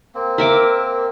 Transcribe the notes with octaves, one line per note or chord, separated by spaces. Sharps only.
A#3 C4
A#4 E5 D6